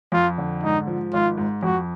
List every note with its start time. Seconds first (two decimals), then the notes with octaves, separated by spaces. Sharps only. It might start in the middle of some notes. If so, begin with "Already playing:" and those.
0.12 F2 F4
0.38 D3
0.63 G#2 D#4
0.87 F3
1.13 G#1 F4
1.38 G#2
1.63 F2 F#4